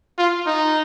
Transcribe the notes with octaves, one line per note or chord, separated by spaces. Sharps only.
F4
D#4